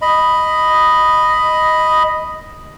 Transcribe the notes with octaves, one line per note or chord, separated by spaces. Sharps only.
D#5 B5